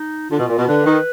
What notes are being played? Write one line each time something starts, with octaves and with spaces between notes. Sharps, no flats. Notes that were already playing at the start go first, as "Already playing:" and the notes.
Already playing: D#4
D3 F4
B2
A#2
B2
D3 B4
D#3